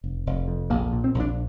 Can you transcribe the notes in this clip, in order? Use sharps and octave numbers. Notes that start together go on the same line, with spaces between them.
F1
F1
F2
A#1 A#3
A#2
C4
A#1
D4